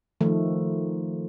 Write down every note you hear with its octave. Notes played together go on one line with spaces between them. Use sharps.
D#3 F3 A3